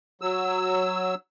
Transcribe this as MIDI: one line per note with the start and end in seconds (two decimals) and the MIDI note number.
0.21 1.15 54
0.21 1.15 88